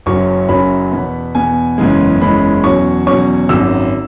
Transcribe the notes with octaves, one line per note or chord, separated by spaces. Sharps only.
F#1 F#2 F#3 C#4 C#6
F#1 F#2 F#3 C#4 B5
E2 B2 B3
E2 B2 B3 G#5
F#1 E2 C#3 E3 G#3
F#1 E2 C#3 E3 G#3 B5
E2 B2 F#3 C#4 C#6
E2 B2 F#3 C#4 C#6
G#1 F#2 F#3 E6